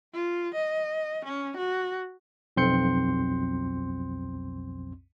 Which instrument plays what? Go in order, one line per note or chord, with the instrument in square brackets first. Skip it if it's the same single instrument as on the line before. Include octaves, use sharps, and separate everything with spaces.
[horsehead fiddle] F4
D#5
C#4
F#4
[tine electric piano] B1 F2 C4 C6 G6 C#7